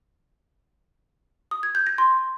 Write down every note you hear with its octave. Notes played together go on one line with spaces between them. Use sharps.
D#6
G#6
G6
A#6
C6